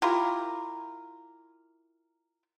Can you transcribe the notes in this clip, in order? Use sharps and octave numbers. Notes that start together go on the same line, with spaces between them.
E4 F4 G4 A#4